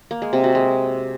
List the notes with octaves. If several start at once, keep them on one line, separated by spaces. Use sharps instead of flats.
A#3
G#3
C3
F#4
G#3